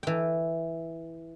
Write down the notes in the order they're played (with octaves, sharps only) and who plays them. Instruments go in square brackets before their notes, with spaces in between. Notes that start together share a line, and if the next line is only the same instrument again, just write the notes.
[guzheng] E3 G5